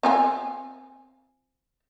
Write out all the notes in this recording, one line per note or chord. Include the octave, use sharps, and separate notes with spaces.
C4 F4 G#5